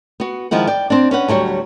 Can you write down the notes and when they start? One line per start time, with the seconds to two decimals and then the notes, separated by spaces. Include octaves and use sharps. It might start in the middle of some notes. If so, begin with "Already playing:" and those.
0.20 B3 F#4
0.51 D#3 F3 G#3 E4 F#5
0.67 D5 G5
0.90 C4 D4
1.11 C#4 B4 F#5
1.28 D2 F#3 G3 C#5